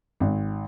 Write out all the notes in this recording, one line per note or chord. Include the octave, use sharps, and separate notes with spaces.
G#1